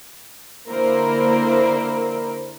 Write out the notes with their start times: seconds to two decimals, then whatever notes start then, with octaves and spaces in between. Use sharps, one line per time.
0.69 D3 A#3 E4 A#4 C5